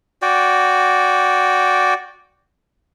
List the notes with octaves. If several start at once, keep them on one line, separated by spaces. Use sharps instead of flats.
F#4 D5 G5